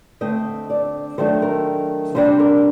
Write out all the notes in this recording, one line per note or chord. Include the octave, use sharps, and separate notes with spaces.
D3 A3 C4 D#5
D5
D#3 F#3 A3 D4 C5
A#4
C3 G3 D4 C5
A#4